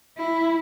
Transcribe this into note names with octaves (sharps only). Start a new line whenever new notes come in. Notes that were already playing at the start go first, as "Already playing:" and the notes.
E4